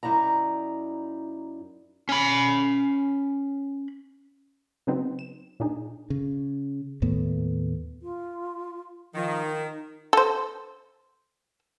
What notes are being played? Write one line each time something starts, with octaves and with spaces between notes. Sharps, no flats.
F#2 D#4 E4 D5 A#5
C#4 B5
C#3 F#3 B3 C4 D#4
E7
A#2 D4 D#4 G#4
C#3
D#2 A2 A3 B3
F4
D#3 F3
D#4
A4 C5